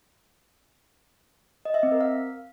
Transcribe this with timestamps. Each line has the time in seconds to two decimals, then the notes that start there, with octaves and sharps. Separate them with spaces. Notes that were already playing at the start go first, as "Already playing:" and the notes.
1.65 D#5
1.74 E5
1.83 C4
1.92 A#4
2.01 F5